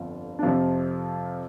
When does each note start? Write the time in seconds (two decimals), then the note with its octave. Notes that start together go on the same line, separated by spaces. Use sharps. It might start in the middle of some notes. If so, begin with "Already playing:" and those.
Already playing: G1 F2 F3 F4
0.39 D4
0.43 F2 C3 F3 F4